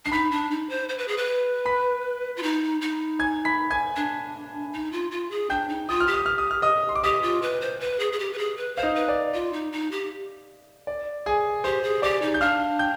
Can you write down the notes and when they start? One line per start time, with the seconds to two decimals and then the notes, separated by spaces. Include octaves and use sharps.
0.05 D4 C7
0.12 D#4 B5 B6
0.31 D4
0.51 D#4
0.69 C5
0.89 C5
0.98 B4
1.08 G#4
1.17 B4
1.65 B5 B6
2.37 F4
2.43 D#4
2.81 D#4
3.19 G#5 G#6
3.45 B5 B6
3.71 G#5 G#6
3.96 D4
4.73 D#4
4.92 F4
5.11 F4
5.31 G#4
5.50 D4 G5 G6
5.69 D#4
5.88 F4 D#6
6.00 F6
6.07 G4
6.14 D#6
6.26 F6
6.38 D#6
6.51 F6
6.62 D#5 D#6
6.89 C6
6.96 D6
7.03 G4 D#5 D#6
7.23 F4
7.42 B4
7.61 C5
7.80 B4
7.99 G#4
8.12 G#4
8.19 G4
8.33 B4
8.38 G#4
8.57 B4
8.76 C5 F5
8.83 D#4 D#5
8.95 B4
9.08 D5
9.34 F4
9.53 D#4
9.72 D#4
9.91 G4
10.87 D5
11.26 G#4 G#5
11.64 G4 C5 C6
11.83 G#4
12.02 G4 D5 D6
12.22 D#4
12.34 G6
12.41 D4 F5 F6
12.79 G5 G6